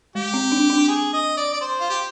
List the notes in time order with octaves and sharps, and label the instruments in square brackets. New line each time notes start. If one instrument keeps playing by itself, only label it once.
[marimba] G#3 [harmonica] G4
[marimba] C4
D4
D4
[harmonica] G#4
D#5
D5
D5
C5
F4
G4